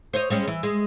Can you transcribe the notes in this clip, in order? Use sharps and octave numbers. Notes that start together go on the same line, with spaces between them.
C5 C#5 D#5
G3 G#3 C#4
E3
G#3